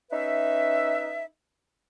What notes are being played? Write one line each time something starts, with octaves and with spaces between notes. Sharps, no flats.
C#4 D#4 B4 E5